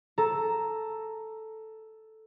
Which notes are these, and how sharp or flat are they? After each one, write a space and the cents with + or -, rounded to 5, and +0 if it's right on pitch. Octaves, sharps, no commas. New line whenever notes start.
A4 +0 A#5 +0